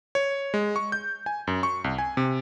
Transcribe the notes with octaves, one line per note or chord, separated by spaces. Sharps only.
C#5
G#3
C#6
G6
G#5
F#2
C#6
C2
G#5
C3